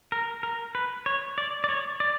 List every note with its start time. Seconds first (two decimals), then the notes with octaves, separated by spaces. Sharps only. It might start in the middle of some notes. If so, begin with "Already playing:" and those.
0.12 A#4
0.43 A#4
0.75 B4
1.06 C#5
1.38 D5
1.64 D5
1.69 C#5
2.00 D5